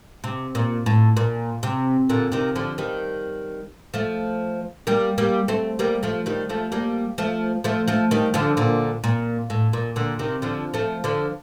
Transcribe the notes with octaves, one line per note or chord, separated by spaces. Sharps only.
C3
A#2
A2
A#2
C3
A#2 D3
C3 D#3
D3 F3
D#3 G3
F3 A3
G3 A#3
G3 A#3
A3 C4
G3 A#3
F3 A3
D#3 G3
F3 A3
G3 A#3
F3 A3
F3 A3
F3 A3
D#3 G3
D3 F3
A#2 D3
A#2
A2
A#2
A#2 D3
C3 D#3
D3 F3
F3 A3
D3 F3